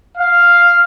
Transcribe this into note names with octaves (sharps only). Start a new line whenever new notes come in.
F5